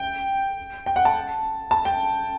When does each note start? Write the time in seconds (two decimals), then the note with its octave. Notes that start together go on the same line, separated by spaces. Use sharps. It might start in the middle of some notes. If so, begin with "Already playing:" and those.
Already playing: G5
0.86 G5
0.96 F#5
1.05 A5
1.71 A5
1.85 G5